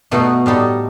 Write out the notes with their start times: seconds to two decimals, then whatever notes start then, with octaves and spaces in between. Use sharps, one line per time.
0.11 B2 A3 D#4 F#4
0.46 A2 G3 D#4 A4